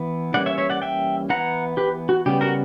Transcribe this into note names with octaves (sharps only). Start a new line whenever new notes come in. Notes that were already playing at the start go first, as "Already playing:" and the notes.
Already playing: E3 B3
E3 G3 A#3 C#4 D5 F#5
C#5 E5
C#5 E5
D5 F#5
E5 G5
E3 B3 F#5 A#5
G4 B4
F#4
C#3 G3 B3 G4
F#4 A#4